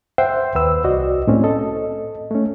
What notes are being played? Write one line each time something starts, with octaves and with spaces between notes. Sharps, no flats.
C5 E5 F#5 G5 C6
D#2 B4 E6
C2 F#4 D5 D#5
A2 C4 C#4
A4 D#5
A3 C#4